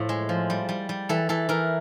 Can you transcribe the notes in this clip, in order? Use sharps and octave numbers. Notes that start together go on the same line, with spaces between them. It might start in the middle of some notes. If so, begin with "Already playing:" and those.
Already playing: A2 F3 E4
G#3
F3
G3
G3
G3
E3 A4
E3 A4
E3 A#4